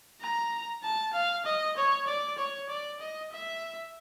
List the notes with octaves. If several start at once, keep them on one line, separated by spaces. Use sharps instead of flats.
A#5
A5
F5
D#5
C#5
D5
C#5
D5
D#5
E5